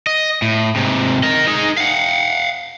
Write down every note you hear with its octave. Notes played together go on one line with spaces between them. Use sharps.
D#5
A2
G#2 C3
A#4 D#5
D#4 G#4
F5 F#5